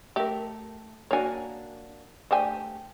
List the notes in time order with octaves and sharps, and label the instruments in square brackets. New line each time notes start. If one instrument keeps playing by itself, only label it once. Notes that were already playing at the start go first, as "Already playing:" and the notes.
[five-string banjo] A3 A#4 [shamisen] G4 E5
[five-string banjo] A#3 D4 F#4 [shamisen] C#5 G#5
[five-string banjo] A3 G4 [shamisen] D4 C5 G#5